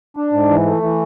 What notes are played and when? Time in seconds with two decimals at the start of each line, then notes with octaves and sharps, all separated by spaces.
0.17 D4
0.33 G#2
0.49 E3
0.65 A3
0.83 E3